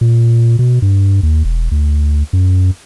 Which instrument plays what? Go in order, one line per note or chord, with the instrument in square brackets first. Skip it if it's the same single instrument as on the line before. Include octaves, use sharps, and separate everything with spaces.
[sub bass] A#2
B2
G2
D#2
E1
D2
F#2